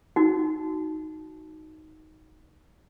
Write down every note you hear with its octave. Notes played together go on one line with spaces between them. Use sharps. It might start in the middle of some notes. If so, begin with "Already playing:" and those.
D#4 F#4